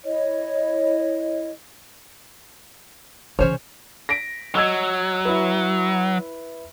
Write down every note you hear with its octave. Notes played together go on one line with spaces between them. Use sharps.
E4 C#5 D#5
C#3 E3 C#4 C5 C#5
A#6 B6 D7
F#3 D#5 E6 G#6
E4 B4